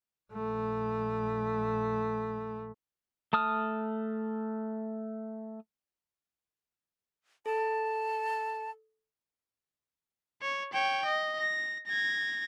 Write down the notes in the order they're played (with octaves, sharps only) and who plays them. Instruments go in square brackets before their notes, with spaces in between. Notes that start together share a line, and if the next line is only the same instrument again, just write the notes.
[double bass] A#1 A3
[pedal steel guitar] A3 A5 D#6 F6
[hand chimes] A4 [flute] A5
[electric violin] C#5
C#5 G5
D#5
A#6
G#6 A#6